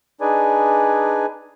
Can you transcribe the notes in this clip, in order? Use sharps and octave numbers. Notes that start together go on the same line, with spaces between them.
D4 D#4 G#4 B4 D5 G#5